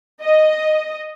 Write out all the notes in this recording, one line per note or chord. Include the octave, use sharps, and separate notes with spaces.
D#5